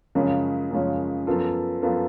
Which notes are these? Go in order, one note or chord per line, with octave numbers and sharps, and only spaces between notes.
F#2 C#3 F3 G#3 C#4
F#2 C#3 F3 G#3 C#4
F#2 F3 B3 F4 A4
F#2 F3 B3 F4 A4